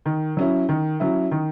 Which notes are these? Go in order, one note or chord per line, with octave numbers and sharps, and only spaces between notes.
D#3
F#3 C#4 E4
D#3
F#3 C#4 E4
D#3